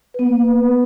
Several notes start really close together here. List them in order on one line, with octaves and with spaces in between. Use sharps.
B4 B3 A#3